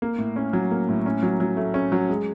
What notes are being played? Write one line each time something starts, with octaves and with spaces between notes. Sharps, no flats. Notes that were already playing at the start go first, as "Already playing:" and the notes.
A#3
A2
C#4
F#3
A#3
A2
C#4
F#3
F#3
A3
C#4
F#3
G#3